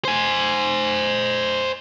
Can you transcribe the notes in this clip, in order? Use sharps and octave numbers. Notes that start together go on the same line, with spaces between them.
C5 G#5